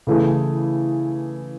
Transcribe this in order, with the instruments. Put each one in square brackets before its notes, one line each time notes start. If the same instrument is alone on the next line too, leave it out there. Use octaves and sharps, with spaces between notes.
[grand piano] C#3 E3 A3 E4 G#4